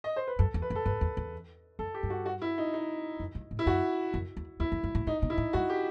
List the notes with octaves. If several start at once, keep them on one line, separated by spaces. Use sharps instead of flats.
D#5
C5
B4
F#2 A4
E2
B4
F#2
A4
G2 B4
E2
E2
F#2 A4
G4
G2
F#4
F#4
E4
D#4
D#4
F#2
G2
A2
E4
F#2 F#4
F#2
E2
E2 E4
F#2
G2
A2
A2 D#4
B2
E4
A2
G2 F#4
G4